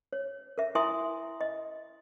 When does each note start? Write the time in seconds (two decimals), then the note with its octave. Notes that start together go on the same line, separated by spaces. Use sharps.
0.13 C#5
0.58 A#4 E5
0.75 E4 A#4 E5 G#5 C6 D#6
1.41 D#5